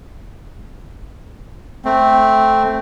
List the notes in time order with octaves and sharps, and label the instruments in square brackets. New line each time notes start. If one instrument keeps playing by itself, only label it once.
[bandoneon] A3 C4